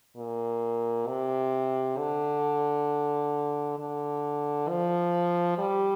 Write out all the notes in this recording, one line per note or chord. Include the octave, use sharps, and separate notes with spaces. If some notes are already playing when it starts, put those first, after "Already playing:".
A#2
C3
D3
D3
F3
G3